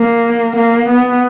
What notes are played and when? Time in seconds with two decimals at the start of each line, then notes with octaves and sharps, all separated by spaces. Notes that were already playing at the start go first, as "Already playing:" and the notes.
Already playing: A#3
0.56 A#3
0.88 B3